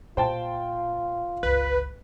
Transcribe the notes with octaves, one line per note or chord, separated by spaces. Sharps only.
A#2 F4 C5 G5 A5
G1 C#2 B4